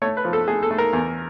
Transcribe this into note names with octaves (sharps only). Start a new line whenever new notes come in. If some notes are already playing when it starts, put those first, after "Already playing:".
A3 C#5
B4
F3
A4
A3 G#4
A4
A3
A#4
E2